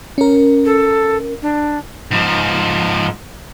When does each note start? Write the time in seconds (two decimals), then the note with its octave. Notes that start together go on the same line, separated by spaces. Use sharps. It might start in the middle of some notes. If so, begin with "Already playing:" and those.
0.18 C#4 A#4
0.65 A4
1.42 D4
2.11 G#2 F3